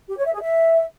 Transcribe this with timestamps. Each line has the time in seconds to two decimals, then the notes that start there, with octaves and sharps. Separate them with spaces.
0.09 G4
0.17 C#5
0.25 E5
0.33 G#4
0.41 E5